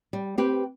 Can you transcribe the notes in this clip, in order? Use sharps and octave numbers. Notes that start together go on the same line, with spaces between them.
G3
C4 G4 B4